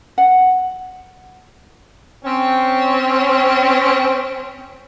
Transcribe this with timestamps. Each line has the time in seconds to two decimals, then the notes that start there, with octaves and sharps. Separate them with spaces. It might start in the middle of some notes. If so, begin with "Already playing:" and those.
0.18 F#5
2.23 C4 C#4